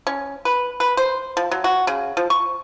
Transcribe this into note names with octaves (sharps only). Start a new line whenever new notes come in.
C#4
B4
B4
C5
F3
F#3
F#4
C#3
F3
C#6